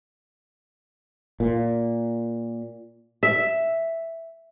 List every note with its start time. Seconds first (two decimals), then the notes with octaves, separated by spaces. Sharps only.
1.40 A#2
3.23 E5